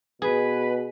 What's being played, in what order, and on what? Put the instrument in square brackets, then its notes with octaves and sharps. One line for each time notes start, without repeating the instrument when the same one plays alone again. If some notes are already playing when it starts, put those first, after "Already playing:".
[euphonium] B2 [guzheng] G#4 [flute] B4